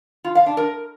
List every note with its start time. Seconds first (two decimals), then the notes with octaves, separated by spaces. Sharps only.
0.24 F4
0.35 F5
0.46 D4
0.57 A#4